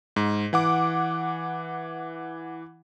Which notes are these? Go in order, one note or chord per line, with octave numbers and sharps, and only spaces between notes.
G#2
E3 F#5 D6